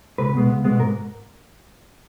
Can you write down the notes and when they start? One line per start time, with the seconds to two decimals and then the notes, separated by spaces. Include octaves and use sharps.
0.18 C#2 B4
0.34 B2 G#3 B3
0.49 C#2
0.64 B2 G#3 B3
0.80 G#2 A#4